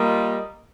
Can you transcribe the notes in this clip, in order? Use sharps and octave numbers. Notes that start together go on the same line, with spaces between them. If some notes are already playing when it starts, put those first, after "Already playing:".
Already playing: G3 A#3 F4 A#4 D#5